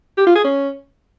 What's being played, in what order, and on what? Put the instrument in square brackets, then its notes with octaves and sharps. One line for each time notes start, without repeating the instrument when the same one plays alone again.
[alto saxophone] G4
F4
G#4
C#4